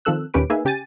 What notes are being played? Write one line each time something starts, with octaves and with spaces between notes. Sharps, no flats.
D#3 F3 C4 A4 E6 F#6
D#2 A#2 C#4 G4 B4 D7
A#3 D#4 G#4 B4 E5 G#5
C#3 G4 G5 G#5 A6 D#7